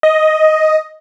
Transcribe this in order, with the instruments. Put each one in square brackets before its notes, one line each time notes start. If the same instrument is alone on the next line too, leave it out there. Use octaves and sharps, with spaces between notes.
[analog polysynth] D#5